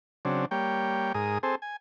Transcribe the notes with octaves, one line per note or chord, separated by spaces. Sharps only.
C#3 F#3 C4 D4
G3 A#3 C#5 G5
G#2 G#4 A#4 D#6
C4 G#4 A4 C5
G#5